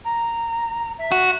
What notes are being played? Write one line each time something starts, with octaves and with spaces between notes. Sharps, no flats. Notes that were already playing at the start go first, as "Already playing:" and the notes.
A#5
E5
F#4